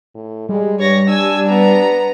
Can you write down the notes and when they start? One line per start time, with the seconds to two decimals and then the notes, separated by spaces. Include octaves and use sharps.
0.15 A2
0.49 G3 G#3
0.79 G2 C#5 A#6
1.09 D4 G#5 E6
1.48 B3 A#5